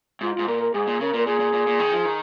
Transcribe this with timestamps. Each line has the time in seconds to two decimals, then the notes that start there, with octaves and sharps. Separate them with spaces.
0.21 G#2 F4
0.34 G#2 F4
0.47 A#2 A#4
0.61 A#4
0.74 G#2 G#4
0.87 A#2
1.01 C#3 A#4
1.14 A#2 A#4
1.27 A#2 G#4
1.40 A#2
1.53 A#2
1.67 A#2
1.79 D#3
1.92 F3
2.05 D#3